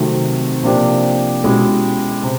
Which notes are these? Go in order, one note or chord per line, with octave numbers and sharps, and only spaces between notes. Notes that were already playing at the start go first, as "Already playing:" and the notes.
Already playing: C3 D#3 F#3 A3 C4
C3 F3 A#3 D4 G4
B2 G#3 C#4 E4 G4
C3